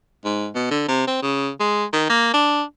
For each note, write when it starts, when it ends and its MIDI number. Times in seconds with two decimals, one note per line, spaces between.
0.25 0.48 44
0.55 0.66 47
0.71 0.87 50
0.88 1.04 48
1.07 1.20 60
1.22 1.50 49
1.60 1.85 56
1.93 2.08 51
2.10 2.32 58
2.34 2.63 62